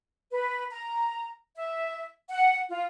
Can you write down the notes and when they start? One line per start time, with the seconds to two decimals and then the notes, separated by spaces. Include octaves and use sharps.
0.32 B4
0.71 A#5
1.56 E5
2.29 F#5
2.69 F4